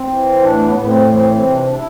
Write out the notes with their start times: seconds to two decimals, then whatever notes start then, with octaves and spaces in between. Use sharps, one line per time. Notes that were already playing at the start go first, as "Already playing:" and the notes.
Already playing: C4
0.08 E3
0.42 A2 D4
0.63 B3
0.74 A2 B3
0.86 C4
1.07 E3 C4
1.30 C4
1.41 C3
1.52 D4
1.59 C4
1.67 D4
1.74 E4